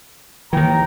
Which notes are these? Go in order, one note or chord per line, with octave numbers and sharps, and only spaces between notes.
D#2 D#3 E3 G5 A#5